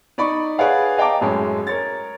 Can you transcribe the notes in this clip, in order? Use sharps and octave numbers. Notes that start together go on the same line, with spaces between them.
D#4 D5 B5 C#6
G#4 B4 C#5 D5 F5 F#5
D#5 F5 G5 A5 A#5 D6
F#2 A2 G#3 C#4
A#4 C#5 A6